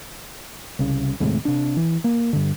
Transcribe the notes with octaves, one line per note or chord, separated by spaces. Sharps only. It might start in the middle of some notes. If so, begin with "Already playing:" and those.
C2 C#3
D#2 A2 C3 G#3
C3 D4
E3
A#3
G2 D3